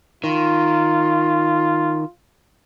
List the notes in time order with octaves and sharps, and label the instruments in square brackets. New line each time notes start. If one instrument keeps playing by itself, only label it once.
[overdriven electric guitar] D#3 [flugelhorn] F4